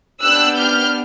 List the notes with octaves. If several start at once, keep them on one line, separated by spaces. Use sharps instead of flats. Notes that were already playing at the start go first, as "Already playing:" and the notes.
B3 D4 G4 E6 F#6
F6 G6